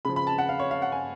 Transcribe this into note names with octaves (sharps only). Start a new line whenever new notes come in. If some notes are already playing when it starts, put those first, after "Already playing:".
C#3 F3 B5
B5
A5
F#5
F5
C#5
F5
F#5
G#5